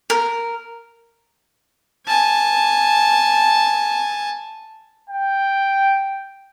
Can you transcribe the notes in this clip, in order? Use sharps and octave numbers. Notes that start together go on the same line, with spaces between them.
A#4
G#5 A5
G5